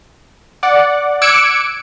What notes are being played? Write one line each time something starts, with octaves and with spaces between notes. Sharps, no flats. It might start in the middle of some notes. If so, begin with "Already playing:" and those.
D5 F#5
D6 E6 F#6 G#6 C#7 D7